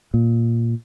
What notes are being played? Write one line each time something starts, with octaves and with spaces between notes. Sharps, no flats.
A#2